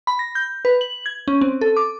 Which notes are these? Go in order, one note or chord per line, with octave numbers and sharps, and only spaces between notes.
B5
A#6
G6
B4
F#7
G#6
C#4
C4
A4
D6